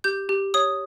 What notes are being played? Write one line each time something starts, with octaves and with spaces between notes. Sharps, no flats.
G4 G6
G4
C#5 D#6